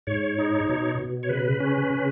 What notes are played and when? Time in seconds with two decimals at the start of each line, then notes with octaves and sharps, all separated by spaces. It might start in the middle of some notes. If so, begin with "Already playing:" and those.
0.07 G#2 C#5
0.38 D#4
0.69 B2
0.99 B2
1.23 C#5
1.29 C#3 B4
1.60 C#4
1.90 C#3